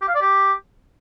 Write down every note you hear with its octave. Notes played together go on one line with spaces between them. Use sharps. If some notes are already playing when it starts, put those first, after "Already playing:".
G4
F5
D5
G4